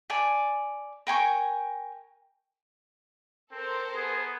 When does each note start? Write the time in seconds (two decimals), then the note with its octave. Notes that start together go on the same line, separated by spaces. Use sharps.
0.10 D5 G#5 A5
1.07 A#4 G5 G#5 C#6
3.52 C4 A4 A#4 C5
3.96 B3 G#4